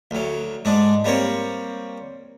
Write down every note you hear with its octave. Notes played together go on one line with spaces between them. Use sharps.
D2 F#3
G#2 G#3 D4
G3 A#3 C4 C#5